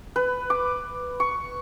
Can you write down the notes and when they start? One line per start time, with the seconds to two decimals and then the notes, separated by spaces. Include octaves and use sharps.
0.16 B4
0.50 D6
1.20 C#6